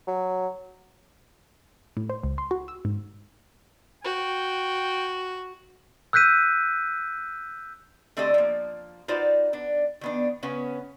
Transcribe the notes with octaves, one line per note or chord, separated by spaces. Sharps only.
F#3
A2
C5
C#2
C6
F#4
E6
G#2
F#4 G5
E6 F#6 G6 B6 D#7
D3 A3 C4 G4 D5 D#5
F3 A#3
D#4 F4 F#4 B4 C5 D5
B3 D4
D#3 B3 D4
C#3 B3 C#4 B4